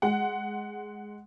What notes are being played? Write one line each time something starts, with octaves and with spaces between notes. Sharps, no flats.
G#3 F#5